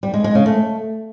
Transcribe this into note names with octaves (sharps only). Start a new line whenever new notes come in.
G3
G#3
G#3
C#3
A3